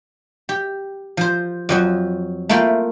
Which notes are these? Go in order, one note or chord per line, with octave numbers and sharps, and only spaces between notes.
G4
F3 C5
F2 F3 F#3
A3 A#3 E4 F4 F5 G5